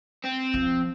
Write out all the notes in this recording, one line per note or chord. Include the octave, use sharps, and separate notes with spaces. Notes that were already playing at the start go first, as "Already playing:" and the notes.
C4
F3